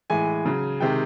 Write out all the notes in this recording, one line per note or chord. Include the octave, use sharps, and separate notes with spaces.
A2 E3 G#3 G#5
C#3 F#3
C3 D#3 G#3 G5